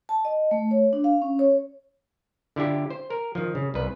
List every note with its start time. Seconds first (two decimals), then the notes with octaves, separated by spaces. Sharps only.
0.09 A5
0.25 D#5
0.51 A3
0.71 C#5
0.93 D4
1.04 F5
1.22 C#4
1.39 C#5
2.56 D3 E4 F4 G4
2.90 C5
3.10 A#4
3.35 D#3 F3
3.55 C#3
3.74 C2 B4